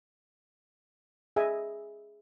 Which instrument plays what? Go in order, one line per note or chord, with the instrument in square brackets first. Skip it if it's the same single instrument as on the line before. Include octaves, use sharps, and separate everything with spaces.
[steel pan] G#4 D#5 E5 G#5